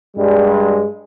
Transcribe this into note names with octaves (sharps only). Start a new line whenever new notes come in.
G2 G3 G#3